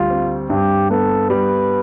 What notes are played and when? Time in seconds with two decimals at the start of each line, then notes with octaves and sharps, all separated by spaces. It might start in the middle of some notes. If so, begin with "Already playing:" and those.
Already playing: D2 G3 F4
0.10 C4
0.50 G2 G4
0.90 B3 A4
1.30 G3 B4